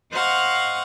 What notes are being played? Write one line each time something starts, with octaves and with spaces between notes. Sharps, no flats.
C5 D#5 F5 F#5 C#6